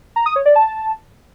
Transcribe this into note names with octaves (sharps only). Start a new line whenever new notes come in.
A#5
D#6
C#5
D5
A5